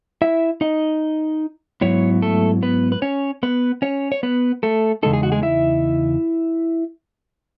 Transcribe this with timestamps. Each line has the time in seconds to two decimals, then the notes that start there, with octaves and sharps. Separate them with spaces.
0.22 E4 E5
0.61 D#4 D#5
1.81 G#2 F#3 B3 E4 C#5
2.22 A3 A4
2.62 B3 B4
2.92 B4
3.02 C#4 C#5
3.43 B3 B4
3.82 C#4 C#5
4.12 C#5
4.23 B3 B4
4.63 A3 A4
5.03 E2 C#3 G#3 D#4 A4
5.13 G#4
5.23 F#4
5.32 G#3 G#4
5.43 E4 E5